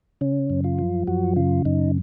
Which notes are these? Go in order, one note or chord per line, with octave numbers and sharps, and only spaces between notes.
C#3 C#4
F#2
F4
F3
F#2 F#4
C#3 F4
F#2 D#4